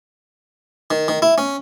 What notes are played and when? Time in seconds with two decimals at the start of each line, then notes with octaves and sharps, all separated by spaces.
0.91 D#3
1.08 D#3
1.22 E4
1.38 C#4